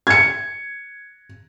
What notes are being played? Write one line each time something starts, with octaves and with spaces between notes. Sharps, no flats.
G#6 C#7